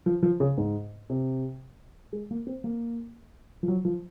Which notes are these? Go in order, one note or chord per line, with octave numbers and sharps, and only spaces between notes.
F3
F3
C#3
G#2
C3
G#3
A#3
C4
A#3
F3
F#3
F3